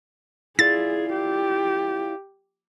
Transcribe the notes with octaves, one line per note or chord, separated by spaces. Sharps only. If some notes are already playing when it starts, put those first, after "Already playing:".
E4 F4 G#4 D5 A6
G4